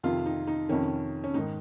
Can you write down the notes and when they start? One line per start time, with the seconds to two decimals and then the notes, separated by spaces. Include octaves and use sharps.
0.03 F2 C3 D#3 F4
0.25 D#4
0.47 D#4
0.69 F2 C3 D#3 C#4
1.24 C#4
1.34 G#2 D#3 D#4